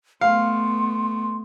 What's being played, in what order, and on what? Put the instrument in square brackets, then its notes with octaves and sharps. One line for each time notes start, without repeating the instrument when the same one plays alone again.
[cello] A3 B3 [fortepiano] F5 [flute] C6